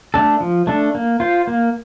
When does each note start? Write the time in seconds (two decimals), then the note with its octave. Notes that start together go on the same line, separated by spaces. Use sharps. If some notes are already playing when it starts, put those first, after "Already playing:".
0.14 A3 D4 A4
0.40 F3
0.67 A3 D4 A4
0.95 A#3
1.20 F4 C5
1.47 A#3